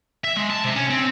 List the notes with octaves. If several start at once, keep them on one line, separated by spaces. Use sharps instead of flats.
E5
G#3
A5
C3
C#4
C4